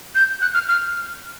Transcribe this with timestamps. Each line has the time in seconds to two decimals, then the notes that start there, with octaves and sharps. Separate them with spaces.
0.15 G6
0.42 F#6
0.54 F6
0.68 F6